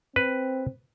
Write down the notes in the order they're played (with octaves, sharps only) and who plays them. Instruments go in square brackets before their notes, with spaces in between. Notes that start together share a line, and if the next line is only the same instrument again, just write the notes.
[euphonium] C4 [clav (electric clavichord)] B4